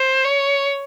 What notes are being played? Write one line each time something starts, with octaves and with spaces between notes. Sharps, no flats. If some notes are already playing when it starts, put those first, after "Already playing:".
Already playing: C5
C#5